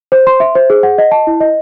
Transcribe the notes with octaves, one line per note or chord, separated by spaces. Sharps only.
C5
C6
E5
C5
G#4
F#5
D#5
A5
E4
D#5